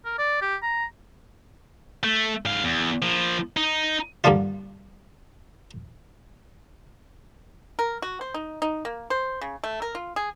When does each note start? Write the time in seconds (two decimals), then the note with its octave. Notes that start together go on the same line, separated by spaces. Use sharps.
0.05 A#4
0.18 D5
0.41 G4
0.62 A#5
2.04 A3
2.45 G#2 F5
2.64 E2
3.02 F3 A#3
3.57 D#4
4.24 G2 D3 G3 A#3 D4 F4
7.79 A#4
8.02 F#4
8.21 C5
8.34 D#4
8.62 D#4
8.85 A#3
9.10 C5
9.41 C#3
9.64 A3
9.82 A#4
9.95 F4
10.16 G#4